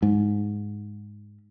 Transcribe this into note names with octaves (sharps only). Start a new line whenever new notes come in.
G#2